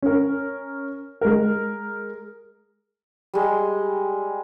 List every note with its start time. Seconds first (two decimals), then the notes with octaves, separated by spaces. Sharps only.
0.02 C#4 A#4
1.21 G#3 A#4
3.34 G3 G#3